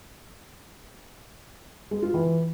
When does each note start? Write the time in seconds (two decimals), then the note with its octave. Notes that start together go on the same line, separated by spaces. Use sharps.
1.91 G#3
2.02 F4
2.14 E3